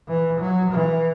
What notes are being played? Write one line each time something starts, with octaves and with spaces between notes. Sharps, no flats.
E3
F#3
E3